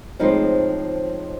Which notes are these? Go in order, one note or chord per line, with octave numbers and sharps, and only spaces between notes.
A2 F3 G#3 C4 D#4